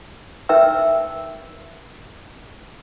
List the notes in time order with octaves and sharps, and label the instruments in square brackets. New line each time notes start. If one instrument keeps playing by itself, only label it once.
[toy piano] D#4 A#4 B4 E5 G5 E6